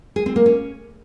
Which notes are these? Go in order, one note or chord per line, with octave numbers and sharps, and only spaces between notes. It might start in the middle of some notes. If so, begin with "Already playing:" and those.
G#4
C4
A#3
C#4